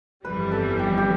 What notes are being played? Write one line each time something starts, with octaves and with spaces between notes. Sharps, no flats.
G1 F2 E3 G3 B4
A4
G4
G4